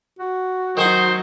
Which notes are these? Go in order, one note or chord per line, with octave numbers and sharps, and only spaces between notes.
F#4
D#3 F#3 D#4 G#4 C5 F#5